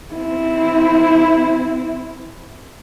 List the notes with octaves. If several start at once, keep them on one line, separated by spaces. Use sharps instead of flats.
C4 E4